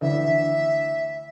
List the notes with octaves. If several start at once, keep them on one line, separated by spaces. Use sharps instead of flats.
D2 E3 E5